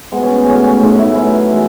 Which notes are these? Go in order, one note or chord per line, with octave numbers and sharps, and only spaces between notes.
B2 G#3 B3
C#4
A2 G#3 C#4
C#4
A2 G#3 D#4
E4
B2 F#3 A3 E4
E3 G#3